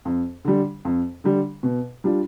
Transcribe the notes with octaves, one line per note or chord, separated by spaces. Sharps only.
F2
D3 G3
F2
D3 G3
B2
G3 D4 F4